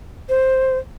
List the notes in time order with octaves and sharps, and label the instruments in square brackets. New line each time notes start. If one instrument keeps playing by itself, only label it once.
[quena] C5